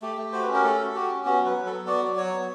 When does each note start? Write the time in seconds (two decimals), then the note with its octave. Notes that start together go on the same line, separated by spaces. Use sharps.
0.02 A3 G4
0.17 A3
0.33 F#4 C5
0.43 B4
0.48 C#4
0.54 A#4
0.64 A3 A4
0.79 F#4
0.95 F#4 G4
1.10 C#4
1.25 B3 F#4
1.41 F#3
1.46 B4
1.56 F#3
1.66 A4
1.71 B3
1.87 F#4 D5
2.02 F#3
2.18 F#4 C#5
2.33 B3